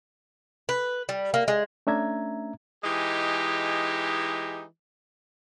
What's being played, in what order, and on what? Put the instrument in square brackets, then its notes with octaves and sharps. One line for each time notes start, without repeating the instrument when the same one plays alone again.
[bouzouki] B4
G3
A#3
G#3
[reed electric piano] A3 C#4 D4 E5 A#5 G#6
[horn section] E3 G#3 D#4 G4